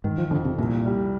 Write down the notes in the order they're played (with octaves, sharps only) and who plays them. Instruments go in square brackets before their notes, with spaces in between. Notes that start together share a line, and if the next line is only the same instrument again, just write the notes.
[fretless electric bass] G#2 [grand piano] D#3
[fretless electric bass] F3
[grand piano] F2 [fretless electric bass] D3
[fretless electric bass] C3
[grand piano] C2 [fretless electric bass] A#2
[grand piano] G3